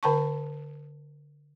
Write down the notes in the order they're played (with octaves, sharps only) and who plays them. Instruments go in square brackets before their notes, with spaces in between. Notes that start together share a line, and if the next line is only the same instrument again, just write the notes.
[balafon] D3 A#4 G5 A5 A#5 C#6